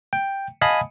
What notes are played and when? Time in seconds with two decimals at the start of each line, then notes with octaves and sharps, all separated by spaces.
0.13 G5
0.61 D#5 F5 G#5 A5 B5 D#6